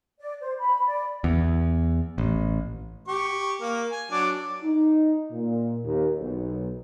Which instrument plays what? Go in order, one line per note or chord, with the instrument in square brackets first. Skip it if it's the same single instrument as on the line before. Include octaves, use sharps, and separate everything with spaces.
[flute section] D5
C5
B5
D5
[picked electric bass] E2
A1
[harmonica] G4 C#6
A#3 A#4
G#5
F#3 D4 D6
[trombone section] D#4
A#2
D#2
B1